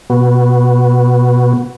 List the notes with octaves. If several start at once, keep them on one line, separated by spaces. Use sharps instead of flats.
B2 B3 F#4